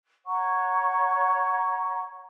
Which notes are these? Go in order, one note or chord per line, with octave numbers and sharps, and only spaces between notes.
C#5 F#5 A#5 C#6